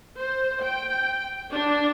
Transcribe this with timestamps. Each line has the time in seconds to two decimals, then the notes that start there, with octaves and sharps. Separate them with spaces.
0.18 C5
0.61 G5
1.51 D4